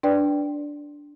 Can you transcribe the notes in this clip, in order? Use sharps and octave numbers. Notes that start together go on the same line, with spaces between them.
D4 B4 D5 G5